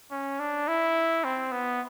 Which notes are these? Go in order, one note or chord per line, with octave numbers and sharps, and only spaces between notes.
C#4
D4
E4
C4
B3